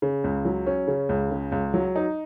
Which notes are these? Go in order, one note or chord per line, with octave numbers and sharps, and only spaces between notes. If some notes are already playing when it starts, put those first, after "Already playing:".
C#3
C#2
F#3
C#4
C#3
C#2
C#3
C#2
F#3
D#4